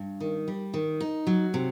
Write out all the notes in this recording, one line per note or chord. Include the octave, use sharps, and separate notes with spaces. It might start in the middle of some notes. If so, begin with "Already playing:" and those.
Already playing: G2
D#3
G3
D#3
D#4
F#3
C3